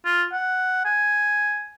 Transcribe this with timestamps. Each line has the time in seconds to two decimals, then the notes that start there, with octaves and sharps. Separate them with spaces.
0.05 F4
0.32 F#5
0.85 G#5